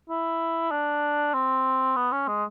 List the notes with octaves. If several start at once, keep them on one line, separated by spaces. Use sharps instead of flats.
E4
D4
C4
B3
C#4
G#3